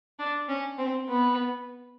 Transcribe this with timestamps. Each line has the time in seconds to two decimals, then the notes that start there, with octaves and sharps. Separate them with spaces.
0.19 D4
0.49 C#4
0.78 C4
1.08 B3